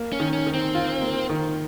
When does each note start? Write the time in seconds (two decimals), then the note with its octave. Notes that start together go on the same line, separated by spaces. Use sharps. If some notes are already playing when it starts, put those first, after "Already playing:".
Already playing: A#3
0.13 C#4
0.20 D#3
0.33 C#4
0.46 D#3
0.54 C4
0.74 F4
1.02 A#3
1.29 D#3